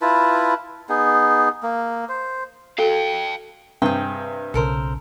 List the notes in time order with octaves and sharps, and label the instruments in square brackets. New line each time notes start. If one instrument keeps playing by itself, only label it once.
[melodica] E4 F4 B4 A5
B3 D#4 G#4
A#3
C5
[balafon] F#4 A4 [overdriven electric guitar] F5 G5
[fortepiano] G2 C3 [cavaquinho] G#4 G5
[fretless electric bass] B1 C#3 [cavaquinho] A4 A#4 C5